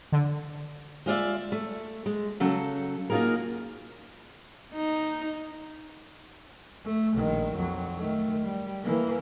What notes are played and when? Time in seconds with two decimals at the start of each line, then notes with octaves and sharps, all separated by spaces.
0.12 D3
1.06 G#3 F4 D5 E5
1.52 A3
2.06 G#3
2.40 C#3 F#3 A4
3.10 A#3 D#4 F4 F#4 G#4 A#4
4.74 D#4
6.84 A3
7.15 A#1 D#3
7.56 F2 F#3
7.97 D#3 A3
8.44 G3
8.83 E3 A#3